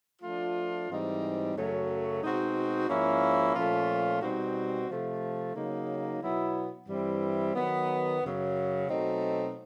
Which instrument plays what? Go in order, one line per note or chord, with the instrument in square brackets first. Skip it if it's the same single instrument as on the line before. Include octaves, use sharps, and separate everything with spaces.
[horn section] F3 A3 D4 F4
G#2 E3 G3 C4 D#4
F#2 C#3 F#3 A3 C#4
B2 G#3 C4 D#4 F#4
G#2 F3 A#3 C#4 E4
A#2 F3 A3 C#4 F4
B2 G3 C4 D#4 F#4
C3 F3 A3
C#3 F#3 A#3 D#4
B2 F#3 B3 E4
G2 E3 G3 C4 E4
D#3 F#3 B3
F#2 C#3 F#3
B2 F#3 A3 C4 D#4